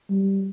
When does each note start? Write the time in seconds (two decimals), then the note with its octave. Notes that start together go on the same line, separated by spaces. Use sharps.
0.10 G3